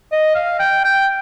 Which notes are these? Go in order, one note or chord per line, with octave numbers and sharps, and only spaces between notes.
D#5
F5
G5
G5